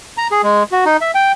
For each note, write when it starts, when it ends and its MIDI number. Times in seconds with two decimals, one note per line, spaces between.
0.18 0.28 82
0.32 0.42 68
0.43 0.63 56
0.72 0.84 66
0.86 0.97 63
1.01 1.11 76
1.15 1.32 79